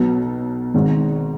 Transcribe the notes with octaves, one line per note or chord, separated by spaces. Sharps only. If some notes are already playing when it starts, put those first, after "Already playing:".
Already playing: B1 B2 F#3 B3
G#1 G#2 D#3 G#3